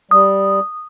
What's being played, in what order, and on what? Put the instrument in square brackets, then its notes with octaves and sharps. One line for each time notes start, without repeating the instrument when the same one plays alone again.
[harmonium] G3 [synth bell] D#6